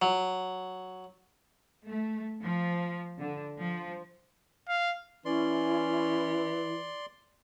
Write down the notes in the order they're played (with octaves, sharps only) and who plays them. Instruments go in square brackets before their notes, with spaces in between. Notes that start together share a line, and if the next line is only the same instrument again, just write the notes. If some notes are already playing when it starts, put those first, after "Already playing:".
[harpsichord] F#3
[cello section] A3
F3
D3
F3
[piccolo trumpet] F5
[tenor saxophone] E3 [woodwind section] C#4 [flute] E4 [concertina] D5 C6